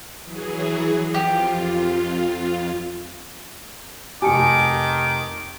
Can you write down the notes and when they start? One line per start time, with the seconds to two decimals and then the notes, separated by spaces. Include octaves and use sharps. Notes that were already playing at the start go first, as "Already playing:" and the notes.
0.23 E3 F#3 G#4
1.14 F2 F4 G4
4.22 F1 D#3 G4 G#5 A5 D6 C#7